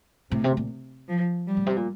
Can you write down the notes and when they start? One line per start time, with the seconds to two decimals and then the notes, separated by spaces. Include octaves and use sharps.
0.31 A2 C3
0.44 C3
0.57 A#2
1.08 F3
1.47 G3
1.57 A2
1.66 C3
1.76 A#2